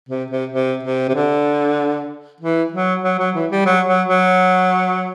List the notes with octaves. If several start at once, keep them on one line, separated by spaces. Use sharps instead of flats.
C3
C3
C3
C3
C3
D3
E3
F#3
F#3
F#3
E3
G3
F#3
F#3
F#3